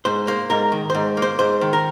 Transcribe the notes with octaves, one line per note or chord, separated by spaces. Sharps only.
G#2 C5
A#3 C5
G#2 A#4
D#3
G#2 C5
A#3
C5
G#2 C5
D#3
A#4